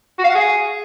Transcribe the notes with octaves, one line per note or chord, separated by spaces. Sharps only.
F#4
F5
F#5
G#4